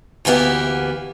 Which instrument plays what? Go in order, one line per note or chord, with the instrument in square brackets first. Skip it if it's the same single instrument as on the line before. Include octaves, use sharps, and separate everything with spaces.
[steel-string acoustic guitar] D2 E3 A#3 B3 G4